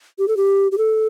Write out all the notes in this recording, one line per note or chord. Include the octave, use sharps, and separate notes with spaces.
G4
A4
G4
G4
A4